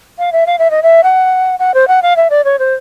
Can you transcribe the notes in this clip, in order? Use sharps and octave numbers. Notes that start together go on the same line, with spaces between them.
F5
E5
F5
E5
D#5
E5
F#5
F#5
C5
F#5
F5
E5
D5
C#5
C5